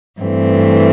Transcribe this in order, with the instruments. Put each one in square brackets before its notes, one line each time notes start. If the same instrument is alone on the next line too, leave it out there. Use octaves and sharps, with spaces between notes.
[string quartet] G2 E3 A3 C4